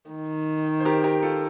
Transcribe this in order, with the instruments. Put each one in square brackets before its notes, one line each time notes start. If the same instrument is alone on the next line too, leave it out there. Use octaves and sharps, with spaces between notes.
[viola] D#3
[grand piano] C5
G4 A#4
G4 A#4
F4 A4